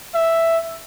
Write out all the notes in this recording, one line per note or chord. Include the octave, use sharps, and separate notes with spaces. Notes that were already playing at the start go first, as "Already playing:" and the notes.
E5